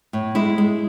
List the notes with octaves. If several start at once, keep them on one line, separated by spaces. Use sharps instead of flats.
A2
G#3 E4
G#3